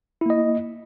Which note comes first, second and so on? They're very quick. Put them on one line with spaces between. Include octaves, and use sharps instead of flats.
E4 A#3 D#5